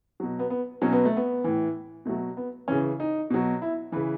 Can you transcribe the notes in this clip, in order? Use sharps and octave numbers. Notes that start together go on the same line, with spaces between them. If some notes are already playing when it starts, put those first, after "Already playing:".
B2 F#3
B3
B3
B2 F#3 C#4
B3
A3
B3
A2 E3
B2 F#3 A3
B3
C#3 E3 C#4
D#4
B2 F#3
E4
C#3 E3 B4